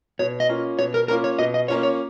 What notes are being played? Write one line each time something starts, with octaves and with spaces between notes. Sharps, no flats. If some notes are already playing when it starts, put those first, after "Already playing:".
B2 C#5
D#5
A#3 C#4 F4
B2 C#5
A#4
A#3 C#4 F4 A#4
C#5
B2 D#5
D#5
A#3 C#4 F4 C#5
C#5